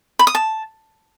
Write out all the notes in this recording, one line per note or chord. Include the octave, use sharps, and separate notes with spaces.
B5
D#6
A5